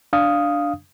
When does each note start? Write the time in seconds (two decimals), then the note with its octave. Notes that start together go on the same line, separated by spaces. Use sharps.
0.13 D4 F5 D#6